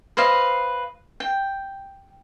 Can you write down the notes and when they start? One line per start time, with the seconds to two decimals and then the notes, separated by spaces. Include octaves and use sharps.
0.17 B4 C5 D#5 F5
1.20 G5